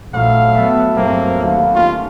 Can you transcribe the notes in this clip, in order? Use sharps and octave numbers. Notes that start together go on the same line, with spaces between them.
A#1 A2 F#3 F5
F#3 B3 A4 E5 G5
G2 F#3 A#3 C4
D#2 B2 A3 F5
C#4 F4